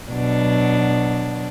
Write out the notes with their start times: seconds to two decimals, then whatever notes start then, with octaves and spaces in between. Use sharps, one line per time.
0.11 B2 F#3 D4